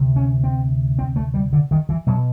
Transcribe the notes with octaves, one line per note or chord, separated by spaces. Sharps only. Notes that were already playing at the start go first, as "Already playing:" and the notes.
Already playing: D2 C3
C#4
C4
C4
A3
G3
D3
D#3
E3
B2 F#3